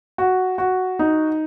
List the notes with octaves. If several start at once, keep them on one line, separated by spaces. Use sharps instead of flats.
F#4
F#4
D#4